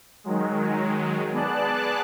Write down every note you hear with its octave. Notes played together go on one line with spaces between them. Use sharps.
D#3 F#3 G#3
B3 G#4 D5 A5 F#6